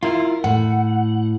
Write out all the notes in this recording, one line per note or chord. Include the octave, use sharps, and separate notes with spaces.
E4 F4 A#4
A2 F#5